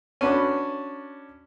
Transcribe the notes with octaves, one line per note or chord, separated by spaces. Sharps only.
C#4 D4 F#4 B4